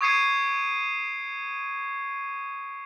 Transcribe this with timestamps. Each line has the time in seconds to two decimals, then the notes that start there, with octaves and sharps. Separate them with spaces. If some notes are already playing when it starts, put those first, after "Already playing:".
0.01 C#6 D#6 G#6 C7 C#7 D#7